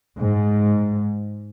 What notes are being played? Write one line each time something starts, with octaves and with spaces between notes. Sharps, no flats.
G#2